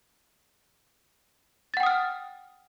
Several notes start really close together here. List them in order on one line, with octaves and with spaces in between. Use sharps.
A6 F#5 G5 D#6 F6